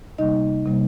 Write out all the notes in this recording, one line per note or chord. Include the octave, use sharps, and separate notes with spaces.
C3 G3 A#3 D#4 D#5
C3 G3 A#3